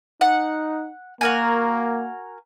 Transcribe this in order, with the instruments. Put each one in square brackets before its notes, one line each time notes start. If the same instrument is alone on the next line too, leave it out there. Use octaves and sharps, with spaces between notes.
[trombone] D#4 [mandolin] F#5
[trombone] A#3 [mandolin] F#4 A#4 G#5